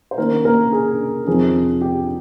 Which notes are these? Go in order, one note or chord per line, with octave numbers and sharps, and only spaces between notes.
C5
D#3 A#3 C#4 A#4
A#3 A#4
G#4
F2 C3 F3 C4 D#4 G#4
G4